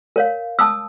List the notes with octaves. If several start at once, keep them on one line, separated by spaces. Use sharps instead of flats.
A#4 C#5 F5
A5 D#6 E6